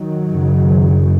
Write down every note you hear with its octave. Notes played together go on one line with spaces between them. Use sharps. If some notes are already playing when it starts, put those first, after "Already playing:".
Already playing: D#3 F#3
F#1 F#2 C#3